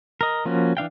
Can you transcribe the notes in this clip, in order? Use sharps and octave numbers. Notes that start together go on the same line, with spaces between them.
A#4 D#5
F3 A#3 C#4 F#4
E3 D4 F5 G5